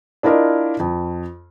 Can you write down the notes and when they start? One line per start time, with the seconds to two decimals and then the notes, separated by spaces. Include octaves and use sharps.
0.23 D4 E4 F4 A#4 D5 D#5
0.80 F2